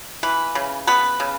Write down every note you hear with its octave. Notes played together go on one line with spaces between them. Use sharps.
E3 B4
C#3
B3 B4
C#3